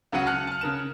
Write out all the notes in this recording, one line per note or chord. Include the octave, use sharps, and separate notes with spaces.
C#2 C#3 F#3 F#5 D#7
A5 F6 F#6 C#7
A5 F6
C#3 A#4 E7